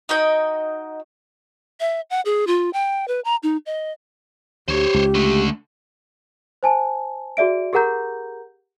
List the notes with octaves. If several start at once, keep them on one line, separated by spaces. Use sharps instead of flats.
D#4 F#4 D#5 G5
E5
F#5
G#4
F4
G5
B4
A#5
D#4
D#5
D2 G4 C5 C#5
C#2
D3 A3
C5 G#5 A5
F#4 G#4 D5 E5 D7
G4 G#4 A#4 F#5 A#5 G6